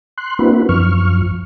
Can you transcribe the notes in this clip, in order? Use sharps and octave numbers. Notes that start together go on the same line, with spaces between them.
C6 F#6
A#3 C4 D4 E4 F#4 B4
F#2 F3 C#6 F6